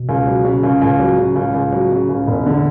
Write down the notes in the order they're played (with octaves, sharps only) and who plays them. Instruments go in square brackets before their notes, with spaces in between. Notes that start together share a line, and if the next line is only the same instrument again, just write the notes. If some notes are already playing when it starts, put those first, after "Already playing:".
Already playing: [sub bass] B2
[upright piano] C#2
F#3
C#3
C#2
[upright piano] C#2 [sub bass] A2
[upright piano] F#3
C#3
C#2
C#2
F#3
C#3
C#2
E1
D3